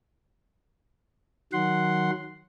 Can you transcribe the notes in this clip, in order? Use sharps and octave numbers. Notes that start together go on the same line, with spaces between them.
D#3 F#3 F#5 C6